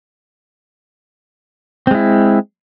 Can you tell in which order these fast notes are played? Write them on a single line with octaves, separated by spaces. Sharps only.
C4 G#3 E4